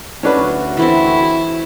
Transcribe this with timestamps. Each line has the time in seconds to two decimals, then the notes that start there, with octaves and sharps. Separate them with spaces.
0.23 D2 C#4 D4 F#4 B4
0.77 E3 A3 C4 E4